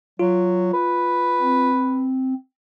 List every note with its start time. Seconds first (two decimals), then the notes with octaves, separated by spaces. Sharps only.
0.19 F#3 F4
0.73 B4
1.41 C4